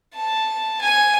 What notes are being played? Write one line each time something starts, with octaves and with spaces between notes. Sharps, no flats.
A5
G#5